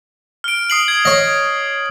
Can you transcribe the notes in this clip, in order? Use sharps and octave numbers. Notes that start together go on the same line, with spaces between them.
F6 D7
D#6 C7 F#7
G#6
C#5 D#5